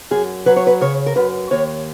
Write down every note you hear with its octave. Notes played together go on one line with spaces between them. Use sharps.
F#2 G#4
F#3 B4
C#5
B4
C#3 C#5
A#4
F#2 B4
D#2 C#5